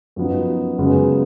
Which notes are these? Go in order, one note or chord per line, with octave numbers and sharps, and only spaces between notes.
F#2 F3 B3 D#4
F#2 C#3 G#3 B3